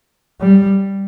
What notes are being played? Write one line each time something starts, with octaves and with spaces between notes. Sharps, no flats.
G3